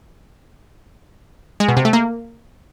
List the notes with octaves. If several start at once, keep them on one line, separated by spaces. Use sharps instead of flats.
G#3
B2
C3
A3
A#3